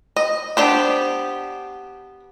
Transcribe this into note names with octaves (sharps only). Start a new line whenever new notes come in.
D#5
B3 D4 G4 C5